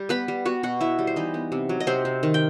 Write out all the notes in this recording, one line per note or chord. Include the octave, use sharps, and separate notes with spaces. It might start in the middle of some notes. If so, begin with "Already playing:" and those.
Already playing: G3
B3 B4 B5
G3
B3 F#4 F#5
B2 F#4 F#5
B3 E4 E5
G3
C5
E3 D#4 D#5
B3
C3
F#3
D#5
C3 C4 C5
C3
D#3
G5